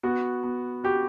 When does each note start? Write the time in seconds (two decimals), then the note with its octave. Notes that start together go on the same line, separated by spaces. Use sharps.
0.03 B3 F#4
0.43 B3
0.84 F#4 G4